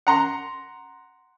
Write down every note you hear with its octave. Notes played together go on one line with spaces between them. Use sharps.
F#5 A#5 C6